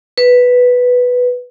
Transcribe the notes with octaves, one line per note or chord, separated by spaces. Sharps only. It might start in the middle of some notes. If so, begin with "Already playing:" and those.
B4